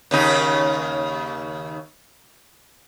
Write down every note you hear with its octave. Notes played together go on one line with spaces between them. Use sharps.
D#2 C#3 D#4